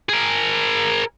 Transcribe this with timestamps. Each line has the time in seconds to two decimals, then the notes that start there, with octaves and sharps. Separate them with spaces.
0.09 G#4 A#4